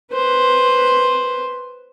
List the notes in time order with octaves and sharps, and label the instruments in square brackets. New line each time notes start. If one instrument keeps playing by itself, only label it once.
[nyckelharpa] B4 C5